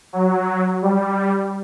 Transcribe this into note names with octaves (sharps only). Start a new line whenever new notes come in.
F#3
G3